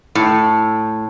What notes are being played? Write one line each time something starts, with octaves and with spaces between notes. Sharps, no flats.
A2